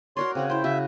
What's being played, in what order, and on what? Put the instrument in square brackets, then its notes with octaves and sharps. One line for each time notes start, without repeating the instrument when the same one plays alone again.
[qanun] F#4 A#4 D5 [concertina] C#5 C6
[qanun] C#3 C#5 F#5 [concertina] C4
[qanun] E4 G5 [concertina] C5
[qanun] C#3 F#4 [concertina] E5